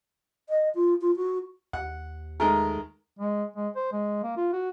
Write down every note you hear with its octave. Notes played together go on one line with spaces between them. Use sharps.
D#5
F4
F4
F#4
D#2 F#5
D#3 G#3 A3 A#4
G#3
G#3
C5
G#3
A#3
F4
F#4